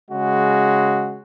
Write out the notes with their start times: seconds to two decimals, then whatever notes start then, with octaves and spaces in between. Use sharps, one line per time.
0.10 C#3 G#3 F#4